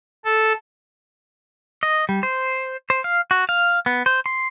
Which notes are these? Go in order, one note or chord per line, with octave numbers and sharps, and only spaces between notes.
A4
D#5
G3
C5
C5
F5
F#4
F5
B3
C5
C6